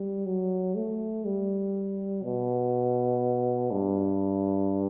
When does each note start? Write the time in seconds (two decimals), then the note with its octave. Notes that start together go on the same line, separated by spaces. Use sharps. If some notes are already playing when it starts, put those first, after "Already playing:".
Already playing: G3
0.26 F#3
0.75 A3
1.25 G3
2.23 B2
3.71 G2